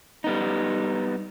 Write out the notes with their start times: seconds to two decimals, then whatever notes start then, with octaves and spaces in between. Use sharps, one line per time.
0.24 G3 B3 D#4